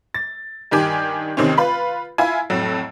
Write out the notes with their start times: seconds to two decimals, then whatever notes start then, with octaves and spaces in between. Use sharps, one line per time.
0.14 A6
0.71 G2 D#3 G4 G#5
1.37 D#2 C3 D#3 C4 C#4
1.58 F4 B4 B5
2.18 E4 F4 G#5
2.50 F2 A2 F#3